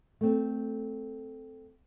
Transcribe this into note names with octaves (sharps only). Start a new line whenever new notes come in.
A3 C4